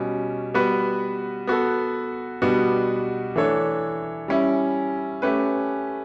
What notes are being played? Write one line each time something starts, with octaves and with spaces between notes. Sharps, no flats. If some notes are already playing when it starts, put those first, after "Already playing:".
Already playing: B2 G3 C#4
G3 B3 F#4 B4
B3 F#4 A4
B2 G3 B3 D4 F#4
E3 A3 D4 A4 C#5
G3 C#4 E4
A3 C#4 G4 B4